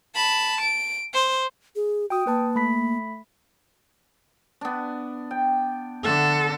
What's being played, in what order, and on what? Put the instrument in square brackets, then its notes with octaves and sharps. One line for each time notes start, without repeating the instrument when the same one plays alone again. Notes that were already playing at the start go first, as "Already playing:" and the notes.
[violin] A5 B5
D7
C5
[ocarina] G#4
[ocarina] F#4 [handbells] G5 D#6
[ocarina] A#3 [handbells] B4 A5
[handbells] A3 B5 B6
[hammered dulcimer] B3 D4
G5
[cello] D3 A4 [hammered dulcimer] E5 F#5